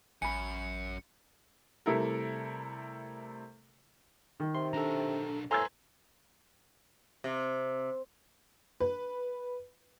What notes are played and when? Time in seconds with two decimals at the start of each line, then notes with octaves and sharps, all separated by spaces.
0.22 A1 F#2 G#5 B5 C#7
1.86 C3 G3 A3 E4 A4 A#4
4.40 D#3
4.55 C3 C6
4.73 B1 D4 A4 A#5
5.51 A2 B4 C5 G#5 A#5 C6 E6 G#6
7.24 C3
8.80 B4